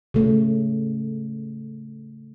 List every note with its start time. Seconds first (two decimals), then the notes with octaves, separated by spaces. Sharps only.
0.14 C#3 A3